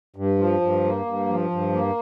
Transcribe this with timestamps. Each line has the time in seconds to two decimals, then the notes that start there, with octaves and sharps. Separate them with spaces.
0.16 G2
0.38 F3
0.61 G2
0.84 A#3
1.06 G2
1.28 F3
1.51 G2
1.73 A#3